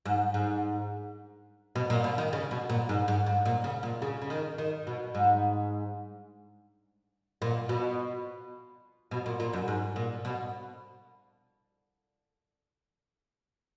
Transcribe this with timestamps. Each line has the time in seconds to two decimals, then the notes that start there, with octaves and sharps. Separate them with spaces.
0.06 G#2
0.34 G#2
1.75 B2
1.90 A#2
2.04 B2
2.18 D#3
2.33 C#3
2.51 B2
2.69 A#2
2.89 G#2
3.08 G#2
3.26 G#2
3.45 A#2
3.64 C#3
3.83 A#2
4.02 C#3
4.22 C#3
4.30 D#3
4.58 D#3
4.87 B2
5.15 G#2
7.42 A#2
7.69 B2
9.11 B2
9.26 A#2
9.40 A#2
9.53 F#2
9.68 G#2
9.96 A#2
10.25 B2